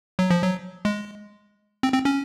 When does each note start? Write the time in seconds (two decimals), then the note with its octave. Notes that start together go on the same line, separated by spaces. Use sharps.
0.19 F#3
0.30 F3
0.42 F#3
0.85 G#3
1.83 C4
1.94 C4
2.05 C#4